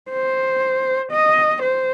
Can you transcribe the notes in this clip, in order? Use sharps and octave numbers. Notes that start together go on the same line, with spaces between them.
C5
D#5
C5